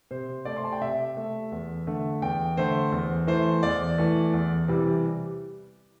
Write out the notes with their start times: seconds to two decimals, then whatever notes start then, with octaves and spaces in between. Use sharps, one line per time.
0.11 C3 C5
0.45 A3 D5
0.56 C6
0.64 A5
0.73 G5
0.81 C3 E5
1.17 A3
1.52 E2
1.87 D3 A3
2.22 E2 G5
2.57 D3 A3 C5
2.92 E2
3.27 E3 A3 C5
3.63 E2 D5
3.98 E3 A3
4.33 E2
4.68 C3 E3 G3